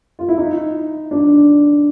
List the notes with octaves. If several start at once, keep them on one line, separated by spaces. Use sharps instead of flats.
F4
E4
D#4
D4